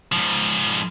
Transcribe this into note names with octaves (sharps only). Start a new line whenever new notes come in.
G#2 F3